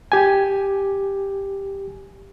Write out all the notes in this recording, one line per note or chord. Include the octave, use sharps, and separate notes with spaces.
G4 G#5